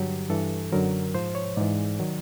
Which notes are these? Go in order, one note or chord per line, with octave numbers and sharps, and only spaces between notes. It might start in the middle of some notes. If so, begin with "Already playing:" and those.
Already playing: G2 D3 F#3 G4
G2 E3 A4
F#2 D3 F#3 A#4
G#2 F3 C5
C#5
G#2 E3 D5
D#3 F#3